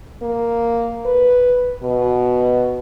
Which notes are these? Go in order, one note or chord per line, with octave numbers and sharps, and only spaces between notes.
A#3
B4
B2